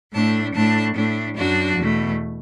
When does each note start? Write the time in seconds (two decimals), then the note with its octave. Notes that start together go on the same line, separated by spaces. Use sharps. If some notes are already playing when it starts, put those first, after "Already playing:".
0.13 A2 A3 D4 A5
0.54 A2 A3 D4 A5
0.95 A2 A3 D4
1.36 F#2 F#3 D4 F#4
1.77 E2 B2 A3